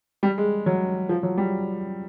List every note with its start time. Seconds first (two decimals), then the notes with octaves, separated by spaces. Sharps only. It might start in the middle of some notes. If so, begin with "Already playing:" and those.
0.23 G3
0.38 G#3
0.66 F#3
1.09 F3
1.23 F#3
1.37 G3